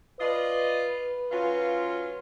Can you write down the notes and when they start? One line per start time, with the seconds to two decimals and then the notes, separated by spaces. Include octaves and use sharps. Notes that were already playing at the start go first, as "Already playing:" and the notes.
0.20 F4 B4 D5 D#5
1.31 F#3 C#4 F4